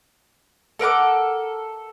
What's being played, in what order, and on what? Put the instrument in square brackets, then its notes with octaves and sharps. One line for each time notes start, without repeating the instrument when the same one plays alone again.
[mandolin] A4 A#4 F#5 D6